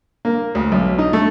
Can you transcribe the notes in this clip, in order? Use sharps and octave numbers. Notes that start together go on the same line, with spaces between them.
A#3
D2
B1
D#4
A3